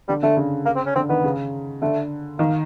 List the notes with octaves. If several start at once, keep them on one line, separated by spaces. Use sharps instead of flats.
D3 G3
D3 A3
C#3
A#3
C4
C#4
D3 C4
D#3 B3
C#3
D3 A3
D#3 A#3